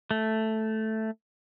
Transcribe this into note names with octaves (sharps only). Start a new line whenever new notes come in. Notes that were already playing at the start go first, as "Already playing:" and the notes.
A3